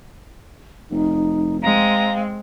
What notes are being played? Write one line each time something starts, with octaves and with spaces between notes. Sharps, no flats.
F1 D#4
G#3 C4 F5 A#5